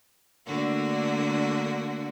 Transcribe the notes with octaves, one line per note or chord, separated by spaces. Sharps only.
D3 A3 A#3 D4 F#4